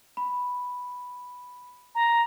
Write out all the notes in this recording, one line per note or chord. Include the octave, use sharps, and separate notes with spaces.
B5
A#5